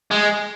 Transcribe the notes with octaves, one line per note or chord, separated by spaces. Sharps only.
G#3